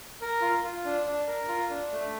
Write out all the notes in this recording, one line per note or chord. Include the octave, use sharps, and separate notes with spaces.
A#4
F4
F4
D4
D4
A#4
F4
D4
A3